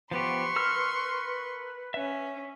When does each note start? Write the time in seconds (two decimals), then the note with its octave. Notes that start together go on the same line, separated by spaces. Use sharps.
0.11 F3 B3 G4 B4 C6 C#6
0.56 A#4 E6 F6
1.94 C#4 E5